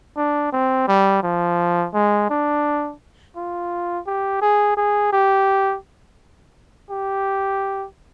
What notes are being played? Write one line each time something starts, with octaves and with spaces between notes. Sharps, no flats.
D4
C4
G3
F3
G#3
D4
F4
G4
G#4
G#4
G4
G4